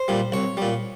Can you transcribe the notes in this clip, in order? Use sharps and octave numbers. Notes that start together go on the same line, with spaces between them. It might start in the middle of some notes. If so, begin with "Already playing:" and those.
Already playing: C5
A#2 G3
C2 C#5
A#2 G3